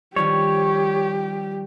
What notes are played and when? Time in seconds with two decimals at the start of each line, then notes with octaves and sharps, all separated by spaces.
0.16 D#3 F3 G3 G4 C#5